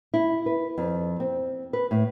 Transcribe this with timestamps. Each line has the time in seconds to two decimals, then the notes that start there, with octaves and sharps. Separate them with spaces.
0.14 E4
0.46 B4
0.78 F2
1.20 C4
1.73 B4
1.91 A2